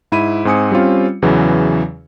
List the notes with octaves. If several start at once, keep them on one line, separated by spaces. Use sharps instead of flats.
G#2 E4 B5 D#7
G#2 C4 G#5 D#6 C#7
G3 C4 C#4 F4
E2 C#3 E3 F#3